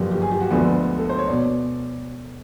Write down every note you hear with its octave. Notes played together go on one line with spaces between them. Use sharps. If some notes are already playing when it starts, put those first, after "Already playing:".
Already playing: G1 F#2 D3 F3 A#3 G4
G4
G#4
G4
F#4
D2 D3 F3 G#3 B3
A4
C5
C#5
B2 D5